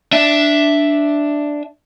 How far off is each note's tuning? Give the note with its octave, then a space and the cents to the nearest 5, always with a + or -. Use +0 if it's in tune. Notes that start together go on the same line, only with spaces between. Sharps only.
D4 +0 E5 +0